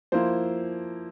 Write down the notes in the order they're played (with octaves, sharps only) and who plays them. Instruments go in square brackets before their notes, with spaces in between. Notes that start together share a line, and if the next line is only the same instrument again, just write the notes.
[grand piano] F3 A#3 E4 C5